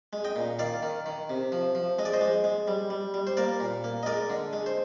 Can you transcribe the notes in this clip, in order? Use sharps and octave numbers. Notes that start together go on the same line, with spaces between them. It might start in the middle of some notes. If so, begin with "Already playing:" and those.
G#3
D#5 G5
A#2
D#3 D5 F5
D#3
D#3
C3
F3
F3
G#3 D#5
D5
C5 D#5
G#3
G#3
G3
G3
G3
C5
A#3 A#4 D5
A#2
A#3
D#5
G#3 A#4 D5
D3
G#3
C5